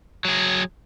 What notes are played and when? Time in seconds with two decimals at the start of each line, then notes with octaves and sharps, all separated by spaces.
0.25 F#3 G#4